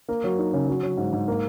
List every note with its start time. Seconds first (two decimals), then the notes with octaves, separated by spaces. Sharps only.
0.09 A#3
0.24 F#3
0.38 D#4
0.53 C#3
0.68 F#3
0.83 F#3
0.97 G#2
1.13 G#2
1.28 A#3